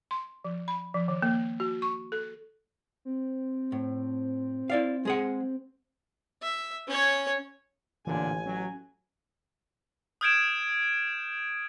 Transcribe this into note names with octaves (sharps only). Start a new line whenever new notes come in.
C6
F3
B5
F3
D#3
A#3
F#4
C#6
A4
C4
A2
E4 D5 F5
G#3 G#4 F#5
E5
C#4 C#5
A1 A#2 D3 E3 G#5
F#3 C#4
D#6 F6 G6 G#6 D7 E7